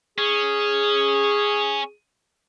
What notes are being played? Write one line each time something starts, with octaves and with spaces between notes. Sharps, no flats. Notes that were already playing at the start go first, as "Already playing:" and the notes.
C#4 G#4